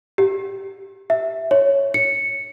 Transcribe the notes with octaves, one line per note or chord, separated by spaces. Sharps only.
G4
E5
C#5
C#7